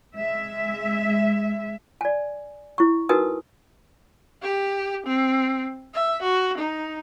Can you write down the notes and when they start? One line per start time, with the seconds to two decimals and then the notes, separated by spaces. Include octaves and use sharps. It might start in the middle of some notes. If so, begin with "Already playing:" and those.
0.16 G#3 E5
2.01 D5 G#5
2.78 E4 C#6
3.09 D#4 F#4 A#4 B4 G#5 D#6
4.42 G4
5.06 C4
5.94 E5
6.22 F#4
6.58 D#4